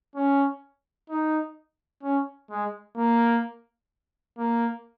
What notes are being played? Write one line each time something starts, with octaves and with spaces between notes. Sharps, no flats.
C#4
D#4
C#4
G#3
A#3
A#3